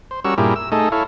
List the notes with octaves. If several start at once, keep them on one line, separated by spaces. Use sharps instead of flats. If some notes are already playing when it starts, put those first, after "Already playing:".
C5
G3 C#4 F#4 A#4 C#6 E6
G2 A#2 E4 G4 G#4 A#4
E6
A3 D#4 G#4 A4 D#5
E4 A4 C#5 F5